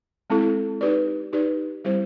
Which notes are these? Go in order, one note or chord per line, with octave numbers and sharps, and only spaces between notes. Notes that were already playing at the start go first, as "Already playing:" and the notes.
G#3 C4 E4 A4
D#4 G4 B4 D5
D#4 G4 B4 D5
G3 C4 E4 G4 C5